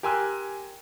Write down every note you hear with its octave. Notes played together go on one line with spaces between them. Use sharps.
G4 A#4 G#5 C6 E6 F#6